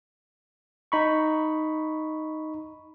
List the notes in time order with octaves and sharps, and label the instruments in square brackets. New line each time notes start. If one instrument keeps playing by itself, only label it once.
[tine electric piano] D#4 B5 C#6